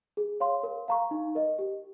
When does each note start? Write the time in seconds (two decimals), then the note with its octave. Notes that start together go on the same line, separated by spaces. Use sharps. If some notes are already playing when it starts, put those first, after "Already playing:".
0.17 G#4
0.40 C#5 F5 C6
0.63 A#4
0.88 F5 A#5 C#6
1.11 D#4
1.35 A#4 D#5
1.59 G4